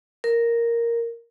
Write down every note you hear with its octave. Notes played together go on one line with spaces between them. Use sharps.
A#4